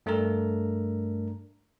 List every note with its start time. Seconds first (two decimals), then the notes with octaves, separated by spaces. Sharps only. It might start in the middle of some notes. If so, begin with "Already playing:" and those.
0.06 G2 A3 D4 A4 A#4 A#5